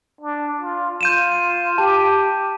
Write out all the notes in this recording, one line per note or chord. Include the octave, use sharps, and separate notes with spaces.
D4
F4
F4 G6 D#7 E7
G4 A5